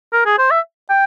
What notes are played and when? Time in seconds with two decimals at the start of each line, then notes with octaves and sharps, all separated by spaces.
0.13 A#4
0.26 G#4
0.39 C5
0.51 E5
0.90 G5